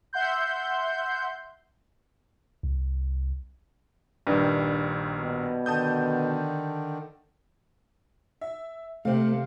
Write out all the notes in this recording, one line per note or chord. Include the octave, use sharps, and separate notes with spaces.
E5 F#5 C6 G6
C2
A#1 G2 D#3
B2
D3 D#3 A5 D#6 G6
E5
C3 A3 C4 F5